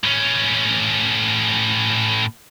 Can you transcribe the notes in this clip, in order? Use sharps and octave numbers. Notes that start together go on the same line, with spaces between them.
A2 C#4